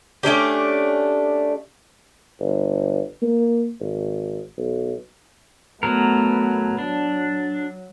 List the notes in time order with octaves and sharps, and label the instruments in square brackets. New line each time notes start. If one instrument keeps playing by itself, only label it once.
[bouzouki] A3 C#4 D4 G4
[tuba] G1
A#3
G#1
B1
[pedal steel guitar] F#3 A#4 [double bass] A3 B3
[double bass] F#3 [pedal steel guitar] D4